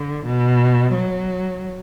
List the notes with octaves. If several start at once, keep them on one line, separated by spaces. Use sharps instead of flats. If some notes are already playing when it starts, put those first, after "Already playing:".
Already playing: D3
B2
F#3